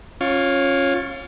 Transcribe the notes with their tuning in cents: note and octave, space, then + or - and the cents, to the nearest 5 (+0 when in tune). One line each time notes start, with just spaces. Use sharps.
C#4 -15 F4 +10 C#6 +35